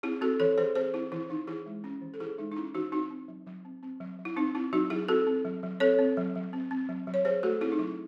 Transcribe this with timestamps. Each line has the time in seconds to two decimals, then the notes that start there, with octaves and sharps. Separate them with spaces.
0.03 C4 E4 G#4
0.21 C4 F#4 A4
0.39 E3 A4 C#5
0.58 E3 G#4 C5
0.75 C4 G#4 C5
0.94 C4 E4
1.12 E3 E4
1.30 E3 D#4
1.47 E3 E4 G#4
1.66 G#3
1.84 C#4
2.02 E3
2.14 A4
2.20 E3 E4 G#4
2.38 G#3 D#4
2.52 D#4
2.56 C#4 E4
2.74 E3 D#4 F#4
2.92 C4 D#4 F#4
3.10 C4
3.28 F#3
3.46 F#3
3.65 C4
3.83 C4
4.00 F#3
4.19 F#3
4.25 E4
4.37 C4 D#4
4.55 C4 E4
4.73 F#3 D#4 F#4
4.90 F#3 E4 G#4
5.08 C4 F#4 A4
5.27 C4
5.45 F#3
5.63 F#3
5.80 C4 A4 C#5
5.99 C4
6.17 F#3
6.35 F#3
6.53 C4
6.71 C4
6.89 F#3
7.07 F#3
7.14 C#5
7.25 F#3 G#4 C5
7.43 A3 F#4 A4
7.61 C4 E4 G#4
7.72 D#4
7.79 F#3 E4